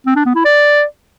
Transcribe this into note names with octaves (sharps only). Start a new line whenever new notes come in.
C4
D4
B3
E4
D5